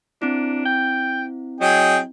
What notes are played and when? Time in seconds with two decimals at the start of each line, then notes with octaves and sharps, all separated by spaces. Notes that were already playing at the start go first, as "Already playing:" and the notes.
0.22 C4 D4 E4
0.65 G5
1.61 F#3 G#4 D#5 G5